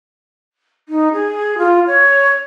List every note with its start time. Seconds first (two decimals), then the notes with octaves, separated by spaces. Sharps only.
0.89 D#4
1.13 G#4
1.58 F4
1.87 C#5